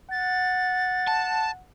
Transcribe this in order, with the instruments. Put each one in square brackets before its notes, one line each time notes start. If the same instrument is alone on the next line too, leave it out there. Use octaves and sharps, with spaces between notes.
[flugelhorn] F#5 [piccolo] A6
[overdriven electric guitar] A5